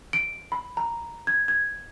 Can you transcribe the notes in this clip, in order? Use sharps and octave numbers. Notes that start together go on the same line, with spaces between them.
D7
B5
A#5
G#6
G#6